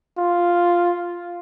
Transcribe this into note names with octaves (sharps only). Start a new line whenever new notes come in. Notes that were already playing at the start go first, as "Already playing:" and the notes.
F4